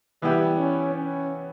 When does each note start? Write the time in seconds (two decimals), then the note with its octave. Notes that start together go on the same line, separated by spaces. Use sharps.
0.22 E3 G3 B3 E4 G4
0.58 C#4
0.95 C#4